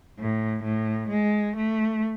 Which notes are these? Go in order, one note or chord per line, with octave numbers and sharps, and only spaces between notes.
A2
A2
G#3
A3